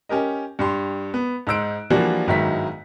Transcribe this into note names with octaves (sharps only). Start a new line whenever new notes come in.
C#4 G4 A#4 D#5
G2 G4 C6
B3
G#2 D#4 C5 E6 F#6 D7
E3 F3 G3 A#3 D4 F#4
G1 G#2 D#3 F#3 E4 B6